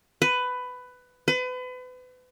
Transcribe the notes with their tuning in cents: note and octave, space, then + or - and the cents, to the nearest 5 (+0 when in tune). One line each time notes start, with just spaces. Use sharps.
B4 +15
B4 +35